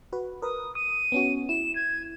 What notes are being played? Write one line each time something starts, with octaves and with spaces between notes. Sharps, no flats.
F#4 B4
A#4 B4 D#6
D#6 D#7
B3 C#4 F#4
E4 E7
G#6